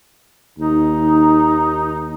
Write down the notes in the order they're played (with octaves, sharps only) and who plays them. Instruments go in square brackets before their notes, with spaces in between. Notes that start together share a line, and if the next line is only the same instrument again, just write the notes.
[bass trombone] D#2 [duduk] D#4